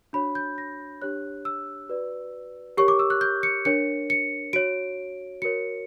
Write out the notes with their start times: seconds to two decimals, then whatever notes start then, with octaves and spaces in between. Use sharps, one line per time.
0.13 D4 F#4 C#5 B5
0.35 G6
0.58 A#6
1.02 D4 G4 C#5 F#6
1.45 E6
1.89 F#4 B4 D5
2.77 G4 A#4 C#5 C#6
2.88 D6
2.99 E6
3.10 F#6
3.21 G6
3.43 C#7
3.65 D4 A#4 C#5 C#7
4.10 C#7
4.53 F#4 C#5 D7
5.42 F#4 A#4 C#5 C#7